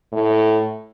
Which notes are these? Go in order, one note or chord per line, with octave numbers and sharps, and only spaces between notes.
A2